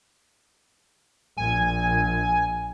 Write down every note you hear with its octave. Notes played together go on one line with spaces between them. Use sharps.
A#1 G#5